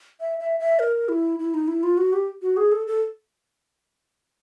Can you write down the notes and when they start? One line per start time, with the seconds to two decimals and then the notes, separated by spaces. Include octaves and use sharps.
0.20 E5
0.40 E5
0.60 E5
0.79 A#4
1.09 E4
1.39 E4
1.54 D#4
1.68 E4
1.83 F4
1.98 F#4
2.13 G4
2.42 F#4
2.57 G#4
2.72 A4
2.87 A4